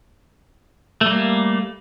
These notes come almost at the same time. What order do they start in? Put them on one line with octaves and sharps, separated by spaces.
A3 G3 A#3